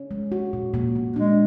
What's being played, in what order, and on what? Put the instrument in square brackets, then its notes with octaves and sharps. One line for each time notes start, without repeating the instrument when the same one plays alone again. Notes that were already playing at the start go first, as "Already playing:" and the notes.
Already playing: [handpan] C#4
G#3
F#4
A#2
A#2
A#2
[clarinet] G#3 [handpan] D4